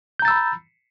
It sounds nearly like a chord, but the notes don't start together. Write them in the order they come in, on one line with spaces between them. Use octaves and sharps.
G6 A#5 A6 E6 B5